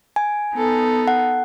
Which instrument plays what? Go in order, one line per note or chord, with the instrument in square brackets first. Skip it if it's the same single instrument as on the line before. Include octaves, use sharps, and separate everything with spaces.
[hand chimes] G#5
[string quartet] B3 D#4 A4
[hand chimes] F#5